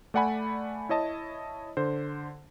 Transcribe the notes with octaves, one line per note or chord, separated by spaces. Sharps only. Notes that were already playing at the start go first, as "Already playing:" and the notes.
A3 D5 F#5 G#5 B5
E4 C#5 D#5 A5
D3 C5